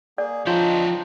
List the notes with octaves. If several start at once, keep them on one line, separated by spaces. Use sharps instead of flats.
A#3 G#4 D5
F3 C4 D4 D#4 F4 C#5 G6